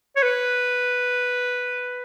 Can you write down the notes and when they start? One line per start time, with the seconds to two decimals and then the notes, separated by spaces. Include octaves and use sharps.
0.16 C#5
0.23 B4